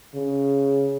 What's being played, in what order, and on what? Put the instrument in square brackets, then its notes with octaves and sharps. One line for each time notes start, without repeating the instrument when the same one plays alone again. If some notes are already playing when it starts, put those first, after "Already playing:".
[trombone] C#3